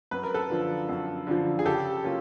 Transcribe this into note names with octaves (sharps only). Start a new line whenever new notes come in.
F#2 B4
A#4
A4 B4
D3 F3
F#2
D3 F3
G#4
C#3 G4 A4
F#3 A#3 C#4 F4